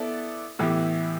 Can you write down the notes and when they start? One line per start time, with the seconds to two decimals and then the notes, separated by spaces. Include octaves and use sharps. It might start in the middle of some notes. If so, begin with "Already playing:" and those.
Already playing: B3 E4 A4 D5
0.59 A2 E3 B3 E4 G4